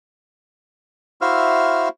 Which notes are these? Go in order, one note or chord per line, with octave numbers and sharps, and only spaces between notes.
E4 F#4 C5 E5 F5 F6